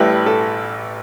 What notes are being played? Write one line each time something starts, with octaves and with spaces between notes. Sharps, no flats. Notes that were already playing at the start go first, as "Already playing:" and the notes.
Already playing: A1 A2 G3 E4 B4
A4